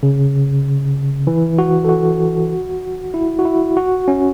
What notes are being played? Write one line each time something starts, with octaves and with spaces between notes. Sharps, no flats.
C#3
E3
F#4
A4
F#4
E4
F#4
E4
F#4
C#4